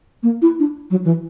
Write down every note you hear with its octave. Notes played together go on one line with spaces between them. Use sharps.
A#3
E4
D4
F#3
E3